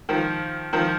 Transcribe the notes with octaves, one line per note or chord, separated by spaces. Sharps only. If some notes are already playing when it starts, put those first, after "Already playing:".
D#3 F3
D#3 F3